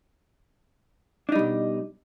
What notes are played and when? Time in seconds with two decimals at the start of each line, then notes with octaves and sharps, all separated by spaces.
1.29 D4
1.32 D#4
1.35 G3
1.39 B2